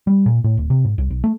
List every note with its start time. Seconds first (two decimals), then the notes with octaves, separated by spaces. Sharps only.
0.07 G3
0.26 A#2
0.44 A2
0.57 D1
0.70 C3
0.84 G#2
0.98 C2
1.10 B1
1.24 A3